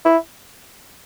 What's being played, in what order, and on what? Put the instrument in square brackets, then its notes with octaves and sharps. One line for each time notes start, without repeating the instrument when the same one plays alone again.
[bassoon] E4